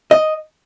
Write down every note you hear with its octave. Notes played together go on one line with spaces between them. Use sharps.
D#5